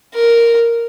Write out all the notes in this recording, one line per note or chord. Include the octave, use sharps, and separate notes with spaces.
A#4